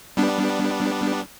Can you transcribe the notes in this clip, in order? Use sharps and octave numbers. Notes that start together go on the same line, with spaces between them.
G3 B3 D4